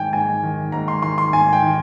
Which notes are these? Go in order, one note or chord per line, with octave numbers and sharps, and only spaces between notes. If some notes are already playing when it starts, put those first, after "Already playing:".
Already playing: G#2 D#3 G5 G#5
G#2 G#5
D#3
G#2 A#5
C6
D#3 C6
C6
G#2 G#5
G5
D#3